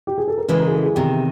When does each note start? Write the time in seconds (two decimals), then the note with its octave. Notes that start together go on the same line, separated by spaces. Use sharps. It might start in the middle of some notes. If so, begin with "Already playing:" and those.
0.07 G4
0.18 G#4
0.28 A4
0.38 A#4
0.48 C#3 E3 G#3 B4
0.60 A#4
0.67 G#4
0.72 A4
0.83 G#4
0.95 E2 C3 D#3 G4